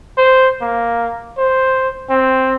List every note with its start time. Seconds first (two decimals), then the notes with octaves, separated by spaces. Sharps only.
0.18 C5
0.62 A#3
1.38 C5
2.10 C4